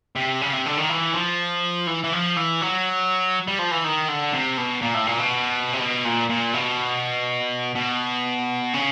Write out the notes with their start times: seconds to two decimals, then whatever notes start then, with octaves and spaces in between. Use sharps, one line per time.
0.16 C3
0.41 C#3
0.53 C3
0.66 D3
0.77 D#3
0.90 E3
1.14 F3
1.87 E3
2.04 E3
2.13 F3
2.37 E3
2.61 F#3
3.48 G3
3.59 F3
3.71 E3
3.84 D#3
4.08 D3
4.33 C3
4.57 B2
4.82 A#2
4.94 A2
5.07 A#2
5.18 B2
5.73 C3
5.79 B2
6.05 A#2
6.29 A#2
6.54 B2
7.75 B2
8.74 C#3